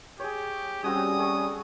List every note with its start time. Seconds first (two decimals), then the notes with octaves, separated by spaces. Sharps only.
0.20 G4 G#4 C#5
0.84 G3 C4 C#4 F#4 G#4 D#6
1.18 A3 G#4 C#6